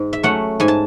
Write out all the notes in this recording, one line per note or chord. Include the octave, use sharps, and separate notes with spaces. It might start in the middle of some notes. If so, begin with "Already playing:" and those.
Already playing: G#2
E5
F#3 A3 C#4 F#5
G#2 G#5
A5